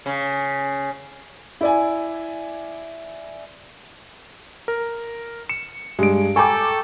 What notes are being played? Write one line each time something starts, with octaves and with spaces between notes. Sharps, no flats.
C#3
E4 D5 G#5
A#4
C#7 E7
G2 G#3 D7
A4 G5 G#5 A#5 C#6 D6